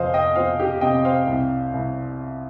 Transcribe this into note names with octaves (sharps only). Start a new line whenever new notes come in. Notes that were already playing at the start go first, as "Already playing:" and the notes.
Already playing: F2 C3 C5 D#5 F5
D#5 G5
F3 C5 F5
G4
C3 D#5 G5
C5 F5
C2
C2